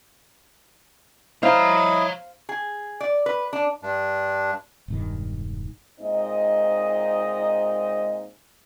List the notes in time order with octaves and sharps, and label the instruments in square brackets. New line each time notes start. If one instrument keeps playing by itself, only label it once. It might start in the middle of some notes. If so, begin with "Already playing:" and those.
[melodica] E4 D#5 [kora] C5 F5 [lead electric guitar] C#5 A#5
[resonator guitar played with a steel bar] G#4
D5
B4
D4
[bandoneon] G2 D4
[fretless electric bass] E1 G2 D#3
[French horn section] A#2 G#3 C4 D#4 D#5